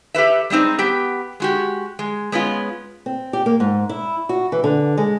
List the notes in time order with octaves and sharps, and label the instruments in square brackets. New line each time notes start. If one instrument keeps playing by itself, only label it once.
[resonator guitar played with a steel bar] G4 A4 B4 E5
G3 G#3 C4 D#4 C5
B3 G4 G5
G#3 F#4 G4
G#3
G#3 B3 C#4 F4
[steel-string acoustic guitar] C4
G4
A#3
G#2
E4
F#4
E3
D3
G#3